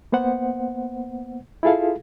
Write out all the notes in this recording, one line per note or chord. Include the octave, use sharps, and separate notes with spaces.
A#3 B3 C5 F#5
E4 F4 G#4 A4 F5